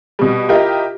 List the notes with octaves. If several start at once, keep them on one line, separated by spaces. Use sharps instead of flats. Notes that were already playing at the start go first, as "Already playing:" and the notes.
B2 G3
E4 F4 G4 A#4 D#5